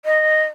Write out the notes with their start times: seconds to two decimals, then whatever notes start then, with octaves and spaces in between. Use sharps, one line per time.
0.05 D#5